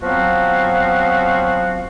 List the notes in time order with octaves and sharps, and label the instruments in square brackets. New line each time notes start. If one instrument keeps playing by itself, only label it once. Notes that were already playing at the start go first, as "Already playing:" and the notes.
[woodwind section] F3 F#3 B3 C4 F#4 F5